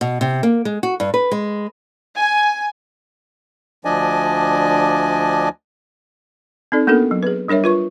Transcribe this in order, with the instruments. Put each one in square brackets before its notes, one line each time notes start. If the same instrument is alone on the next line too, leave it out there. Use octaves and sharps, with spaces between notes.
[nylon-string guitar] B2
C3
A#3
G#3
F#4
G2
B4
G#3
[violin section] G#5
[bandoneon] D2 F3 D4 D5 D#5 G#5
[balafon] C4 D#4 A4 D5
A#3 B3 D4 F#4 A4 A#4
F#3
G#4 B4
G3 D4 A#4 C#5 E5
F4 B4 C#6